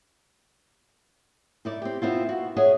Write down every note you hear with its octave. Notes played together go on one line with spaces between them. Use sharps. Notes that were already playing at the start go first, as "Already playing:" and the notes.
D#4 E4 D5
C4 G4
B3 C4 E4 F4
F#4
G#4 C#5 D#5 E5 F#5